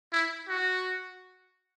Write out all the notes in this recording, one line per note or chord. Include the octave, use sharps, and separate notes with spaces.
E4
F#4